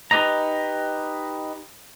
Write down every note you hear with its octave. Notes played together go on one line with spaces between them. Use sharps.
D#4 G4 B4 D#5 A#5